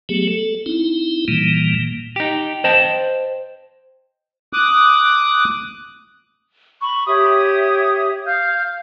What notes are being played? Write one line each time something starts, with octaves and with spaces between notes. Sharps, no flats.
F#3 A3 B3 G4 G#4
A4
C4 D#4 E4
A#2 D#3 E3 G3 A#3
D#4 G4
C5 D#5 G5 A5
D6 D#6 F#6
B5 C#6
G4 C#5 E5 D#6
F5 F6 G6